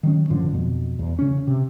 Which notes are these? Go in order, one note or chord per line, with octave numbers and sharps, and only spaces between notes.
D#3 F#3 C#4
A1 F#2 D3 F3
F2 B2
E2
C#3 C#4
C3